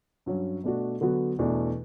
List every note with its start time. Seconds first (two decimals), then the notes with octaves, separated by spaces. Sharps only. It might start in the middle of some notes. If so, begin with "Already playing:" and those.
0.26 G2 F#3 C#4
0.64 B2 A3 D4 F#4
1.01 D3 F#3 B3 F#4
1.39 E2 B2 A3 D4 F#4